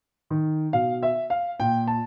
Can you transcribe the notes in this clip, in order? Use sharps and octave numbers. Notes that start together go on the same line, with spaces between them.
D#3
B2 F5
E5
F5
A#2 G5
A5